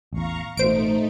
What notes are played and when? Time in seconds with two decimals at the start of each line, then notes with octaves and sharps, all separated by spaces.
0.13 A1 E2 F5 A#5 C#6
0.57 A1 B2 A3 D#4 C5 D7